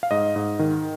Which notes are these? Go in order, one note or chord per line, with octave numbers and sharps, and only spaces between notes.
F5
G#2 D#5
G#2
D#3